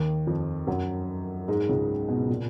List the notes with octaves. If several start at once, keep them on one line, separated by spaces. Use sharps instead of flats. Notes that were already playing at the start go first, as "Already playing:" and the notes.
Already playing: D#2 D#3
F2 F3
F#2 F#3
G#2 G#3
C#2 C#3
B2
A#2